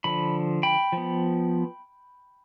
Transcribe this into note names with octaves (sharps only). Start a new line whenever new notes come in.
D3 F3 B5
G5 B5
F3 B3